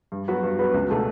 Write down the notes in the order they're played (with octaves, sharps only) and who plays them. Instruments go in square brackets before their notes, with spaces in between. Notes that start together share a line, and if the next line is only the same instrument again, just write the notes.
[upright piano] G2
F#3 B3 F#4 B4
G2
F#3 B3 F#4 B4
C#2
B2 A3 D4